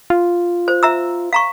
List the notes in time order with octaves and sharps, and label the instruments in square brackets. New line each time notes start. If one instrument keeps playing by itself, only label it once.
[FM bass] F4
[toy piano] C5
E5 A#5 E6
F5 A#5 C#6